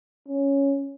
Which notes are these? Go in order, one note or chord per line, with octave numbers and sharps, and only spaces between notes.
C#4